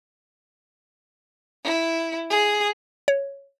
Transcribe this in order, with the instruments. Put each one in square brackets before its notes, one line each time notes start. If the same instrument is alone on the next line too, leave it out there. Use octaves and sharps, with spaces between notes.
[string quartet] E4
G#4
[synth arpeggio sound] C#5